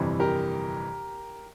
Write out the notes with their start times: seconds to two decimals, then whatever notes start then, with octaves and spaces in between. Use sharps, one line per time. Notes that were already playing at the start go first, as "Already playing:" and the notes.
Already playing: G1 F2 C3 E3 G3
0.20 G4 A#4